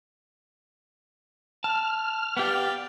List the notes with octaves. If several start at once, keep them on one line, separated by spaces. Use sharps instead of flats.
A5 F6
B3 G4 D5 F5 G5